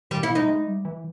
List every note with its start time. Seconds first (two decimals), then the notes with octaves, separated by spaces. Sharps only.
0.11 D#3 G3
0.21 E3 E4
0.35 G#3 D#4
0.48 G#3
0.66 G3
0.85 E3